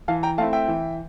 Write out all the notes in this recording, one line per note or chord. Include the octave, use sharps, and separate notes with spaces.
E3 F5 A5
G5 A#5
A3 C4 E4 F5 A5
E5 G5
E3